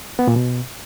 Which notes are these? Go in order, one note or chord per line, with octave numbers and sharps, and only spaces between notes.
B3
A#2
B2